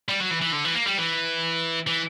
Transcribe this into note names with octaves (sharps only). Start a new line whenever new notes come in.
G3
F#3
E3
E3
D3
E3
A#3
G3
E3
E3